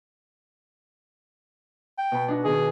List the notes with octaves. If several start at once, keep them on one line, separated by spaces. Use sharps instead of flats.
G5
B2 B5
D4 D#4 F#4
B2 D#3 G#4